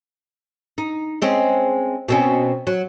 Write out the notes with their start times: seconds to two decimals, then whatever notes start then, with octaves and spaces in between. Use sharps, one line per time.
0.78 D#4
1.22 G#3 C4 C#4
2.08 B2 C4 C#4
2.67 F#3